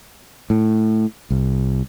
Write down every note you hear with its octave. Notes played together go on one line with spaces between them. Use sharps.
A2
C2